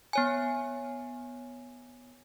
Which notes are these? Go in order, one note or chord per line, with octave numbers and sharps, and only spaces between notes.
B3 C#5 G#5